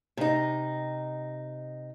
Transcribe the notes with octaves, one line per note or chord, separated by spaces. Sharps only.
C3 D#4